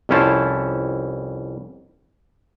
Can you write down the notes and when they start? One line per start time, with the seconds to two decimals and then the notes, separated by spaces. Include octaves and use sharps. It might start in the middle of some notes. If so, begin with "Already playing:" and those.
0.09 C2 F2 C#4 E4 C5 A5